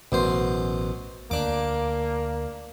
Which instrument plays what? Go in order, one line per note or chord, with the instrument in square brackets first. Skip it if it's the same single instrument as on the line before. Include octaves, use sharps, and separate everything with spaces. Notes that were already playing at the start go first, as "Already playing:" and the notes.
[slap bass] A1 [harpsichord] F#2 B2 C5
[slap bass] D2 [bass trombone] A#3 [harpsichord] D4 D6